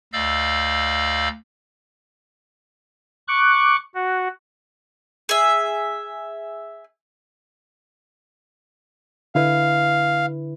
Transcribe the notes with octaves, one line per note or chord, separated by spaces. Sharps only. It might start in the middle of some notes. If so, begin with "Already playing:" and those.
D2 D5 D#5 F5 E6 G6
C#6 D6 F#6
F#4
G#4 E5
D3 E4 B4 F5